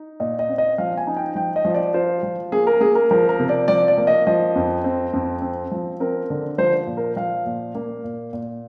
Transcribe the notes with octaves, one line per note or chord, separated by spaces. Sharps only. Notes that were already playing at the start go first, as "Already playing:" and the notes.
Already playing: D#4
A#2 D#5
D#5
C4
D#5
F3 F5
G#5
D#4
G5
F3 G5
D#5
F3
D5
F4 C5
F3
A#3 G#4
A#4
A#3 G#4
A#4
F3 A#4
A#4
C3
D5
F3 D5
D5
A#3
D#5
F3 D#5
F2
C4
F2
C4
F3
C4 A#4
D3
F3 C5
A#2
A#4
F3 F5
A#2
A#3
A#2
A#2